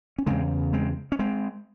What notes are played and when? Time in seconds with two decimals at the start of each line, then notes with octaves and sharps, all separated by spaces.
0.18 C#4
0.26 E2 C#3 G#3 C4
0.73 G#3 C4
1.12 C#4
1.19 G#3 C4